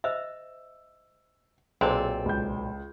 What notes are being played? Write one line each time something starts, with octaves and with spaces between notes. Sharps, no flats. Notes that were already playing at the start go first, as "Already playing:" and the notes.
C5 D#5 E5 E6
B1 A#2 C4 G#4 A4 C5 C6
C#2 G6